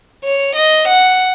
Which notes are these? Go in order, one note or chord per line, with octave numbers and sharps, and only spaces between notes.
C#5
D#5
F#5